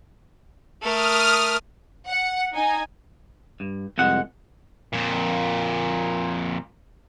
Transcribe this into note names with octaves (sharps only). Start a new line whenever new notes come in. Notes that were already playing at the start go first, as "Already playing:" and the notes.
A3 A#4 D#6 F6
F#5
D#4 G#5
G2
C2 F2 G#3 F#5
F2 A#2